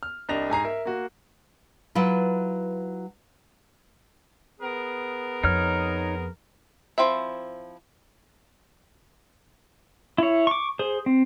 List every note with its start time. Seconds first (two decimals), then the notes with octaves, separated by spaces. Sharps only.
0.03 F6
0.29 C2 D4 D#5 A#6 F7
0.50 G#2 G#5 A#5 C7
0.64 A#4 E5
0.85 A#3 F#4
1.95 F#3 E4 F4 B4
4.59 B3 G#4 A#4
5.44 F2 D#4 C#5 F6
6.98 F3 C4 E4 E5
10.18 E4 C#5
10.47 C#6 D6
10.79 G#4 C5
11.06 C4